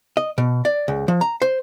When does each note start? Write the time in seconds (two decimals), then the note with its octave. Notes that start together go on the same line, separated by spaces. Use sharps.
0.17 D#5
0.38 B2
0.65 D5
0.88 C#2
1.08 F3
1.21 A#5
1.42 C5